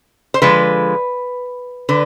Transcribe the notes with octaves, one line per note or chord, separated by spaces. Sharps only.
C5
D3 F3 G#3 B4
D3 B4